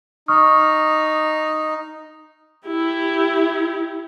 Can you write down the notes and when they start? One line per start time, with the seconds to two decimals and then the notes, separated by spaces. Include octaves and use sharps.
0.28 D#4 C#6 D#6 F6
2.67 E4 G4